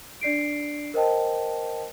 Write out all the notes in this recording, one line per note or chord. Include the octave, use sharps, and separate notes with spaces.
D4 D5 C7 D7
A#4 C5 D#5 G5 A5